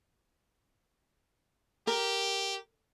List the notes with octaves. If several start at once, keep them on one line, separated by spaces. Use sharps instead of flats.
G4 A#4